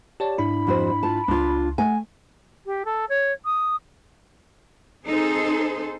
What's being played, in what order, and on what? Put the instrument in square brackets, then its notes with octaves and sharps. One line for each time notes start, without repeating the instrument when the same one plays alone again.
[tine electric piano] G4 C#5 D5 [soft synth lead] A5
[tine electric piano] G#2 D4 E4 [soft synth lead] B5
[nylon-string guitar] F2 F#4 C5
F4 A5
[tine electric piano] C#2 C6 [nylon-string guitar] D4 F4
[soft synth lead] A3 [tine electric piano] F#5 [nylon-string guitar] G#5
[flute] G4
A4
C#5
D#6
[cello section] C4 D#4 G#4 A4 C5